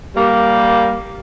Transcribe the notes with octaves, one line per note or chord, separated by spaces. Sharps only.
G3 A#3